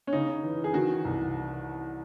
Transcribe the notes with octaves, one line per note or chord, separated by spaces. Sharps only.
C#4
C#3 D#4
E3
G#4
D#3 F#4
C2